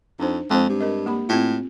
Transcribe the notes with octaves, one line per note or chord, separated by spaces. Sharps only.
F2 D4 D#4 C5
F2 G#3 C4 C5
G2
D4 A#4 D#5
A#3 G4 B5
A2 C4 F4